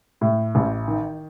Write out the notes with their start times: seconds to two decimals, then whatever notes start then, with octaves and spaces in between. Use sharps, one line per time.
0.21 A2
0.55 A1
0.88 D#3